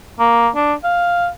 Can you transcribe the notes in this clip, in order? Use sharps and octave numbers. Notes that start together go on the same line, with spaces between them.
A#3
D4
F5